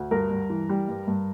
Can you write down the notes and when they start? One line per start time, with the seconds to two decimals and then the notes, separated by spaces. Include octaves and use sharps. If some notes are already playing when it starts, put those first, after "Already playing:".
Already playing: D2
0.11 G2 A#4
0.30 G2
0.50 E3
0.69 G3
0.88 G2
1.07 G2